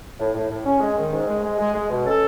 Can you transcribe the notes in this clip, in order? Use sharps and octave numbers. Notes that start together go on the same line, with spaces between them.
A2
A2
A2
C#4
G#3
D#3
G#2
G#3
G#3
G#3
G#3
B2
C#4 A4